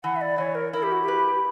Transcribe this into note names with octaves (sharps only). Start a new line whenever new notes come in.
E3 F#5
E5
D5
E3 C#5
A#4
E4 A#4
G4
F#4
G4
B4